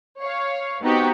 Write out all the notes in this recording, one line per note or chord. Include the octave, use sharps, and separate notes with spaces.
C#5 F5
B3 C4 D#4 F#4 G4